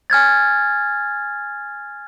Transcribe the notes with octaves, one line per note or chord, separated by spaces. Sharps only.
G#5 F6 G#6 A6